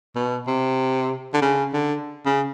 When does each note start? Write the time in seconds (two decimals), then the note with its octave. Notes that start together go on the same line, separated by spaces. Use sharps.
0.16 B2
0.48 C3
1.34 D3
1.42 C#3
1.74 D3
2.26 C#3